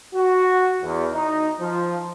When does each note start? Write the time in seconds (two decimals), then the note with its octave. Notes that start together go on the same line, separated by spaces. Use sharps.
0.14 F#4
0.82 E2
1.12 D#4
1.60 F3